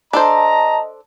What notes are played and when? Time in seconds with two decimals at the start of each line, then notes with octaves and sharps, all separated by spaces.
0.13 D4 A4 C5 D#5 A5 A#5